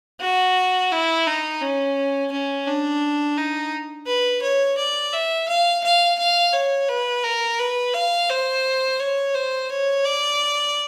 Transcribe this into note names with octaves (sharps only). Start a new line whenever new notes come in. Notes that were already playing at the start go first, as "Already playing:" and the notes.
F#4
E4
D#4
C#4
C#4
D4
D#4
B4
C#5
D5
E5
F5
F5
F5
C#5
B4
A#4
B4
F5
C5
C#5
C5
C#5
D5